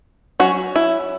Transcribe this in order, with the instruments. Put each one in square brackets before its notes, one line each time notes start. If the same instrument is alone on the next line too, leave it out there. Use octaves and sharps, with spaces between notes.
[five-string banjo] F#3 C#4 F#4
E4